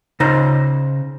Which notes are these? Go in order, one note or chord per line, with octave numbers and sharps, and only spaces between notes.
C#3 D#4 C5 A#5